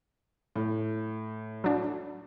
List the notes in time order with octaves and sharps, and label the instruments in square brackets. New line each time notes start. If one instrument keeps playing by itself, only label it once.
[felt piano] A2
[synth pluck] F#3 D4